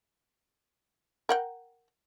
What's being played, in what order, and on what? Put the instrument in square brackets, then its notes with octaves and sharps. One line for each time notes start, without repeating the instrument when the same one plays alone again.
[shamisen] A#4 F#5 G5